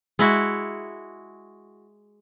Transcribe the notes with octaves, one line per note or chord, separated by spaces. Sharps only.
G#3 E4 F#4